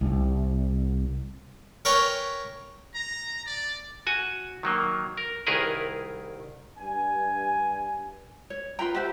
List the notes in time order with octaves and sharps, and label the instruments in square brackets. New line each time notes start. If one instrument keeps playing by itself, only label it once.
[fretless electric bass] C2
[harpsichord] A#4 B4 C#5 G5 G#5
[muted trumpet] A#5
D5
[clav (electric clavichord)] F#4 G#5
D#3 F#3 A#3
A#4
C2 D#3 E4 G#4 A#4 B4
[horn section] G2 G#5
[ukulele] C#5
[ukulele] F4 B4 G5 [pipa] A#5 C6
[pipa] F#4 B4 E5 [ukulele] G4 C5